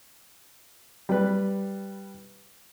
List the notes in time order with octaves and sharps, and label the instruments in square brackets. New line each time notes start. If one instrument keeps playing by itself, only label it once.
[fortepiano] G3 B4